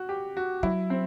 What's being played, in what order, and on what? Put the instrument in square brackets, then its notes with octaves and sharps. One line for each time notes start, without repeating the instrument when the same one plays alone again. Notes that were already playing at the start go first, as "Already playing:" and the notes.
Already playing: [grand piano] F#4
G4
F#4
[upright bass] F#3 [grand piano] E4
[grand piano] C4